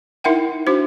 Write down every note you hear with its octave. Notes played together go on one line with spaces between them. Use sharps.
D#4 E4 A#4 E5 F#5 G5
D4 F#4 C5